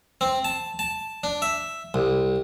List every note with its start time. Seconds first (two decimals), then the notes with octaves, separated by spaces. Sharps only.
0.21 C4
0.45 A5
0.79 A5
1.24 D4
1.42 E5
1.94 C2